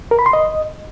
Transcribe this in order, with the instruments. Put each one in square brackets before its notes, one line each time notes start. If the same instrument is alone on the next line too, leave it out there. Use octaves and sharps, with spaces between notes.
[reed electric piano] A#4
B5
C6
D#5